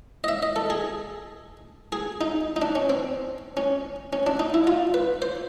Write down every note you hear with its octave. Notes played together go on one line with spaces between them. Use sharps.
D#5
E5
D#5
A4
G#4
G#4
D#4
D#4
D4
C#4
C4
C#4
C#4
D4
D#4
E4
F4
B4
C5